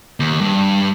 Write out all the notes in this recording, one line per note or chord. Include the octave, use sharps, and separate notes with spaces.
D#2
G2